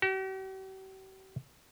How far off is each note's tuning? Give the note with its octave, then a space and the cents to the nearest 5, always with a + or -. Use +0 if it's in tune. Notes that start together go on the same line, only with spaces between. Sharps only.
G4 -45